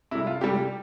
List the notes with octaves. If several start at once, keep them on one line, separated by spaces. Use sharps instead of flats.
C3 G3 E4
F4
C3 G3 G4